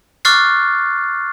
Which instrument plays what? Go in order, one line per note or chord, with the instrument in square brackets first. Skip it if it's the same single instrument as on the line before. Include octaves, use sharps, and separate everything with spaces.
[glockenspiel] C#6 D6 F6 F#6 A6 C7